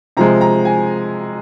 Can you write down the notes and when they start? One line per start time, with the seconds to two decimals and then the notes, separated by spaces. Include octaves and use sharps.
0.17 C3 F3 G#3 A#5
0.41 A#5
0.65 G#5